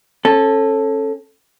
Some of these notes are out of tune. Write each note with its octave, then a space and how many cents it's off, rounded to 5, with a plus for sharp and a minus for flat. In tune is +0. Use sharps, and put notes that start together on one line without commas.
C#4 -30 A4 +0